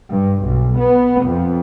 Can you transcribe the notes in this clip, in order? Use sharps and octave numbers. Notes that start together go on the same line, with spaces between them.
G2
B1
B3
F2